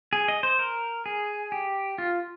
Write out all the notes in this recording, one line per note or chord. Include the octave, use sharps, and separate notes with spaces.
G#4
D#5
C5
A#4
G#4
G4
F4